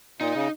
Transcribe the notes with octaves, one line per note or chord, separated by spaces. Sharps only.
A#2 D#4
C#3